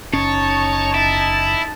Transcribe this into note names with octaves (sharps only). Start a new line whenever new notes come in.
F#1 C#4 D#4 C#5 A5
E4